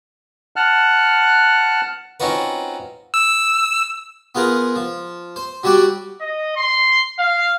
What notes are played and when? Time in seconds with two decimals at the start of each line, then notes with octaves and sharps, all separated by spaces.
0.56 F#5 A5 F6 F#6
2.20 C4 C#4 D#4 F4 F#4 B4
3.14 E6
4.35 B3 F4 G#4 A#4
4.76 F3
5.36 C5
5.63 F#3 G3 F#4 D5 G5
6.21 D#5
6.56 C6
7.19 F5